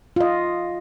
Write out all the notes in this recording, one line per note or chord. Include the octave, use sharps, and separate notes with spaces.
F4 D#5